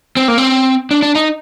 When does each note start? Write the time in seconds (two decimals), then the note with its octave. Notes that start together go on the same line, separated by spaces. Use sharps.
0.17 C4
0.28 A#3
0.38 C4
0.91 D4
1.02 D4
1.15 D#4